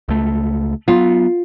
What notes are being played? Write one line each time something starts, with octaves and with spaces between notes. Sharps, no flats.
C#2 A3
F#3 B3 F4